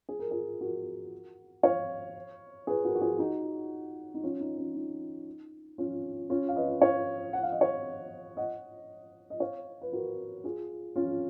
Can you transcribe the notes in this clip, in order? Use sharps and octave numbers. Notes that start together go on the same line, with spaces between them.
G#4
A#4
F4 G#4
F#4 A#4
C#5 F5
G#4 B4
F#4 A#4
F#4
F4 G#4
D#4 F#4
D#4
C#4 F4
D#4
C#4
D#4
C#4 F4
C#4 F4
F5
B4 D#5
C#5 F5
F#5
F5
D#5
C#5 F5
D#5 F#5
D#5
C#5 F5
B4
F#4 A#4
F4 G#4
C#4 F4